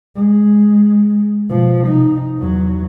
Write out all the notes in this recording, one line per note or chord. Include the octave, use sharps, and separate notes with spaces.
G#3
B2 F3
C3 D#4
E2 F#3